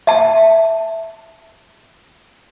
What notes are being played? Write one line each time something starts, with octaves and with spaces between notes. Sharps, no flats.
E5 A5